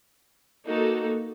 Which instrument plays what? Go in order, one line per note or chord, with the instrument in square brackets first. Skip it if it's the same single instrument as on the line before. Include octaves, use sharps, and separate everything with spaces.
[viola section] A#3 D#4 F#4 A4